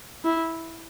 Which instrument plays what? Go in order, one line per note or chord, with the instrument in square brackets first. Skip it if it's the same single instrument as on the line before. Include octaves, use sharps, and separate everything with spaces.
[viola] E4